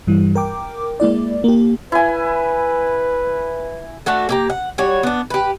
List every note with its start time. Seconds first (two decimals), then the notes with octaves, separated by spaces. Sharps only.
0.07 G2 E3 G3
0.36 A#4 G5 D6
1.00 G#3 A#3 E4 D5
1.44 A#3 G4
1.92 E4 B4 G#5
4.06 A3 D4 F#4 A4
4.29 A#3 G4 A#5
4.50 F#5
4.78 G3 F#4 C#5
5.03 B3 D4
5.30 G4 B4